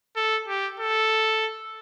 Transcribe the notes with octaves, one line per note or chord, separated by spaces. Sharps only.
A4
G4
A4